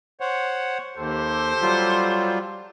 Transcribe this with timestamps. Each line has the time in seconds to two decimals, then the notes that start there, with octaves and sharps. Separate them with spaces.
0.21 C5 C#5 F#5
0.97 D#2 G4 A4 C5
1.61 F#3 G3 F4